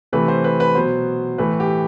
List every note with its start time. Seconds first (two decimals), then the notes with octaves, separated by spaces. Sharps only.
0.13 C3 E3 A3 B4
0.28 C5
0.44 B4
0.60 B4
0.75 B2 F#3 B3 C5
1.38 A2 E3 A3 B4
1.60 G4